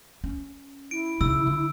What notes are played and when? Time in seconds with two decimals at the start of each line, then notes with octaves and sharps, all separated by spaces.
0.24 C#4
0.91 E4 D7
1.21 C#3 D#4 E6
1.47 D3